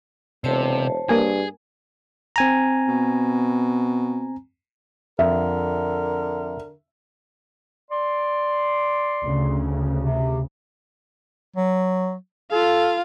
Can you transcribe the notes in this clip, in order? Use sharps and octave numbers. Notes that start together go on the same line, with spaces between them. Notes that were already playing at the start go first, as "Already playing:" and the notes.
E1 C3 C5 C#5 A5
G2 A#3 G#4 G#5
C4 G#5 A#5
B2
F2 D3 A#4 E5
D5 C6
D2 C#3
C3
F#3
F4 A4 F5